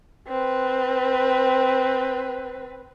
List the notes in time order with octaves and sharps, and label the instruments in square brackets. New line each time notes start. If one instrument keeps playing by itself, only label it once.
[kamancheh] C4 B4